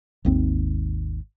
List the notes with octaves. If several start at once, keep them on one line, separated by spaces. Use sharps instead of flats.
G#1 D#2 C4